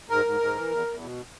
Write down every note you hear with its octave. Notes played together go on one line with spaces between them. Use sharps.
G#2 A#4
G#2
G#2
E3
E2
E2
B2